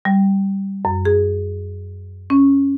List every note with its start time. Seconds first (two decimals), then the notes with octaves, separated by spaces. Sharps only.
0.05 G3
0.85 F#2
1.05 G#4
2.30 C#4